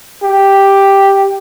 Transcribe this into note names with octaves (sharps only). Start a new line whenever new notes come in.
G4